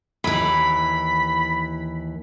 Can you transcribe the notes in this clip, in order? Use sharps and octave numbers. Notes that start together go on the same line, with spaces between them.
D#2 E3 B5